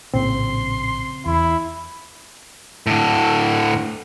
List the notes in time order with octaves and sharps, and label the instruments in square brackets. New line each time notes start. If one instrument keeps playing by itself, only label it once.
[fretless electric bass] A#1 A2 A#3 [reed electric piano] C#3 C4 [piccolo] C6
[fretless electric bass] E2 [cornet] E4
[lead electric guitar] A2 D3